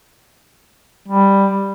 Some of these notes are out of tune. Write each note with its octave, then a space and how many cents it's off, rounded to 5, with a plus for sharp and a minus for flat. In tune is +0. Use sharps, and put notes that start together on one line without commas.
G3 +5